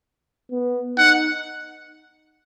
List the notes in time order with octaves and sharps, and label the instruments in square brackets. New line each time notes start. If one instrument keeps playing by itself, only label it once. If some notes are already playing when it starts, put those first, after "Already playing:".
[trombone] B3
[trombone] D#4 [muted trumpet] F#5